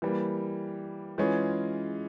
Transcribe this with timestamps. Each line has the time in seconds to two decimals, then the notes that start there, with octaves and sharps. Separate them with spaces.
0.02 E3 G3 A#3
1.18 E3 G#3 C#4 F4 G#4